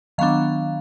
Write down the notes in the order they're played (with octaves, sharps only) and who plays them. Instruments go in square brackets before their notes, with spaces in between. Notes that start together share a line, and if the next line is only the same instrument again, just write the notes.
[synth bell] D#3 F#3 B3 D4 F5